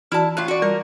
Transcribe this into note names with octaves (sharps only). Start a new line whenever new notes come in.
E3 E4 F#4 D5 A5
A2 F4 F#6
F#4 D5
G3 A#4